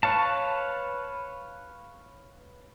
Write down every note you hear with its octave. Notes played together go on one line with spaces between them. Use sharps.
B4 C#5 F5 A5